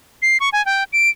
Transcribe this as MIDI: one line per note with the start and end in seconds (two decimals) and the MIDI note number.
0.22 0.37 96
0.40 0.49 85
0.53 0.64 80
0.66 0.84 79
0.93 1.09 98